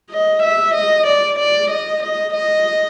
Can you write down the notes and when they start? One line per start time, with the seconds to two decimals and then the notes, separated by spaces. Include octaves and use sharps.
0.10 D#5
0.42 E5
0.74 D#5
1.07 D5
1.39 D5
1.70 D#5
2.03 D#5
2.34 D#5